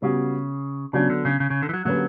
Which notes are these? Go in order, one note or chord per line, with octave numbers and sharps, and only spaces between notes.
C#3 G3 B3 F#4
C#3 F#3 B3 D4
D3
C#3
C#3
C#3
D3
E3
F#3
D3 F#3 A#3 C#4 G4 B4